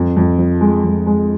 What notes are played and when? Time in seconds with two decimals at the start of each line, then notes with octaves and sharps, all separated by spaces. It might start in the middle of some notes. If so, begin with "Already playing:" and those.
Already playing: F2
0.17 F2
0.38 F3
0.61 G#3
0.84 F2
1.06 G#3